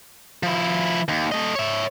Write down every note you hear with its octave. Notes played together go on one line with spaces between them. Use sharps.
F3 E4
D#2
A3 D#5
C#5 E5